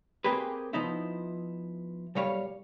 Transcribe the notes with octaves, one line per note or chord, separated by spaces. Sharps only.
A#3 C4 G4 G#4 B4
F3 B3 D#4 E4
B1 A#2 G3 C#5 F5